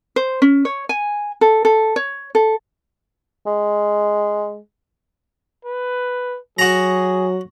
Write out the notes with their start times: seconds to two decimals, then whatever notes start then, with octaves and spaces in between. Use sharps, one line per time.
0.16 C5
0.42 C#4
0.65 C#5
0.89 G#5
1.41 A4
1.65 A4
1.96 C#5
2.35 A4
3.46 G#3
5.65 B4
6.59 F#3 F#4 G#4 A#5